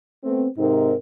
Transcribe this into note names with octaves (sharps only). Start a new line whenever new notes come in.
A3 B3 C4
G#2 C3 C4 D#4 A#4